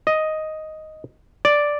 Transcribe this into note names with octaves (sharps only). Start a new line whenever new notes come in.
D#5
D5